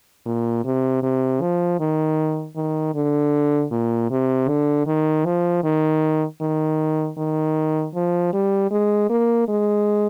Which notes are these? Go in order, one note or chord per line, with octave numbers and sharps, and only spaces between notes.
A#2
C3
C3
F3
D#3
D#3
D3
A#2
C3
D3
D#3
F3
D#3
D#3
D#3
F3
G3
G#3
A#3
G#3